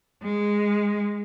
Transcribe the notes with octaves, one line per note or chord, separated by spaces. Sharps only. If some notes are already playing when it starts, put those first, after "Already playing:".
G#3